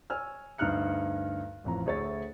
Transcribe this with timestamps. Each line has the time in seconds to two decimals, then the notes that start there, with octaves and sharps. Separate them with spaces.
0.10 C#5 G#5 E6 F6
0.58 D2 G2 D#4 F6 F#6 C#7
1.64 A1 F2 A#5
1.86 D2 G#4 C#5 E5 A6